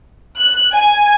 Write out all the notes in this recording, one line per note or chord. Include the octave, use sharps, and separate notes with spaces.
F#6
G#5